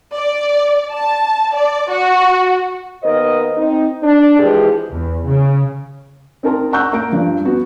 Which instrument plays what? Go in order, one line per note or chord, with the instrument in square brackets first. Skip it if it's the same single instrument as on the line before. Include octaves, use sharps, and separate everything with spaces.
[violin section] D5
A5
D5
F#4
[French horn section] D#2 B3 A#4 C5 D#5
C4 D#4
D4
E3 F3 G#3 G4 G#4
[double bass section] E2
C#3
[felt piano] C4 D#4 A#4 A5 A#5 C6
F#5 A#5 C#6 E6 F#6 G6
A#3 A#5 D7
G2 F3
B3 F#4